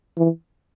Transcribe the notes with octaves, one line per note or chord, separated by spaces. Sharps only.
E3